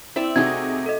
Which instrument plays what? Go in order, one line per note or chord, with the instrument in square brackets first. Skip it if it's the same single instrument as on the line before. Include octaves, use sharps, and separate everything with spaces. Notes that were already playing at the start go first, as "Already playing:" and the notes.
[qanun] C4 D5 E5 [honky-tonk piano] E4
[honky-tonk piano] C3 D#4 G#4 [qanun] A3 F#4 [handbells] G#6
[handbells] A4 D#5